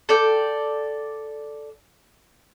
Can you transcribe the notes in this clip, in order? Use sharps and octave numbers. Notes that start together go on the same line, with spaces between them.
A4 D5 G5